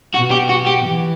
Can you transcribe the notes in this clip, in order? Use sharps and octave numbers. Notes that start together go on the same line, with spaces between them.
B2 F#4
G4
F#4
G4
E3